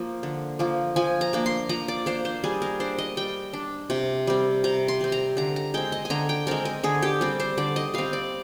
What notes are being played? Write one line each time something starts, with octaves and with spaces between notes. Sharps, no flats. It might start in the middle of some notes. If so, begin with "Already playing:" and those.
Already playing: F3 A#3
D3
F3 A#3
F3 G#5
A#5
A#3 D4
C6
F3 A#5
D5
A#3 D4 C5
C5
G3 G#4
A#4
D4 C5
D#5
G3 G5
D4
C3
G3 C4
C3 A#5
C6
G3 C4
A#5
D3 A#5
A#5
G#3 C4 G5
D#5
G#5
D3 A#5
G5
G#3 C4 A#4
A#4
D3 G#4
G4
G3 C4
C5
D3 D5
D#5
G3 C4 F5
D5